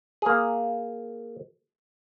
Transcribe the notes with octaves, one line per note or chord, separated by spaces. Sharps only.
A#3 G#4